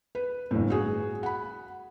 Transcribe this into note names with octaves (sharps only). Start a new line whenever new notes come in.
B4
G1 A2
F#4 G#4
F#5 B5